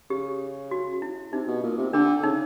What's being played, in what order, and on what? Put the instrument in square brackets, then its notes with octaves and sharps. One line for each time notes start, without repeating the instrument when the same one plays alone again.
[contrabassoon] C#3 [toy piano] G4
[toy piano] F#4
E4
[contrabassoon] C3 [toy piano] D#4
[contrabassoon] B2
A#2
C3
[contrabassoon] D3 [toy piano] D4
[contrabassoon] C#3 [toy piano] D#4